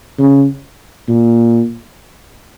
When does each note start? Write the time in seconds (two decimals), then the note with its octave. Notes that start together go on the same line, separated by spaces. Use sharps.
0.19 C#3
1.08 A#2